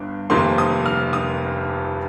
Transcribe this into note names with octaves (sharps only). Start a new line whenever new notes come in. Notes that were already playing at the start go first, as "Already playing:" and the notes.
Already playing: G1 G2
F1 F2 C3 D#3 A#3 C6
D#6
F6
D#6